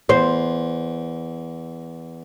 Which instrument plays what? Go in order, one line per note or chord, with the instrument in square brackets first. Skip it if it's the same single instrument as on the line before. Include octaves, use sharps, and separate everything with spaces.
[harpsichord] E2 [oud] C5